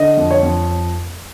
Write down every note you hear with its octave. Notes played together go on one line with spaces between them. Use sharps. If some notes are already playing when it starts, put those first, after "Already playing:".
Already playing: D3 D#5
F2
C#5
F2